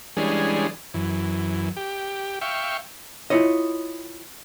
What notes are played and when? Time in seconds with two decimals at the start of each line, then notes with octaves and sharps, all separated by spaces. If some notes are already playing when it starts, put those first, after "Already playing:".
0.17 E3 G3 G#3 C#4 D4 G#4
0.94 F#2 E3
1.77 G4
2.41 E5 F5 G5 C#6
3.30 E4 F4 C#5 D#5